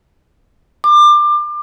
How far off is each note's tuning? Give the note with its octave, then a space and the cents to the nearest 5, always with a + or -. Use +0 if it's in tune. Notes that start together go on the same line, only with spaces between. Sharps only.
D6 +25